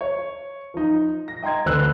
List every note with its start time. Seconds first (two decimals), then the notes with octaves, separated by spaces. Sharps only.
0.01 C#5
0.74 F3 D#4
1.28 A#6
1.43 D#5 G5 A#5 C6 G#6
1.66 D2 D3 C4 B4 E6 F#6